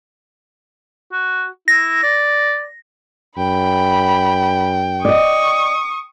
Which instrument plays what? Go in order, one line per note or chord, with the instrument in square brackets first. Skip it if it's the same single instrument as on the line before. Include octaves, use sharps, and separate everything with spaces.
[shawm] F#4
[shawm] E4 [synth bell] A#6
[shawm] D5
[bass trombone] F#2 [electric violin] G5 [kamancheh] B5
[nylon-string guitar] D5 D#5 [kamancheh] C#6 D#6